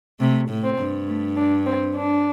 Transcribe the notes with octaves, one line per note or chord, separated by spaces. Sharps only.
C3 A3
A2
C4
G2
A3
D4
C4
D4